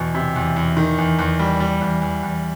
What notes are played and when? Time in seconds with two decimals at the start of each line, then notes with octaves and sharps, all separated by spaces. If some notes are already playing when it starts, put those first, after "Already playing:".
Already playing: E2 B2
0.15 C3
0.36 E2
0.56 E2
0.77 D#3
0.98 E2
1.19 E2
1.39 G3
1.60 G3
1.81 E2
2.02 E2
2.23 E2